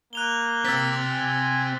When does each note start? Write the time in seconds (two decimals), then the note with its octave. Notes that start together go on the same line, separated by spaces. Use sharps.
0.13 A#3 F#6 F7 G7
0.65 C4 G4 E6 A6 B6
1.11 G#5